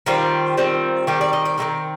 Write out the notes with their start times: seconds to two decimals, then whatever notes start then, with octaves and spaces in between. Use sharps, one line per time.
0.06 D#3 G3 C4 F4
0.57 D#3 G3 C4
1.07 D#3 G3 C4 G4
1.21 D5
1.33 D#5
1.45 D5
1.58 D#3 G3 C4 A#4